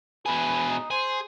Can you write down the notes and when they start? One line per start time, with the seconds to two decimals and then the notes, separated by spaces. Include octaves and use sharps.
0.26 B2 G#4 B4
0.70 D#4
0.90 G#4 C5